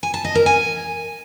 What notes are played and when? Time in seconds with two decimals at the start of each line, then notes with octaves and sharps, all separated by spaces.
0.03 G#5
0.14 A5
0.24 D#5
0.35 A#4
0.46 G#5